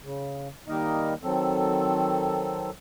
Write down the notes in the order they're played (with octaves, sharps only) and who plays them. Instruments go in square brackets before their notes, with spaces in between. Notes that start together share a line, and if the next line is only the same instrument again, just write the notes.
[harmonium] C#3
D#3 G3 A#3 D#4 A#4 D#5
D#3 F#3 C4 A4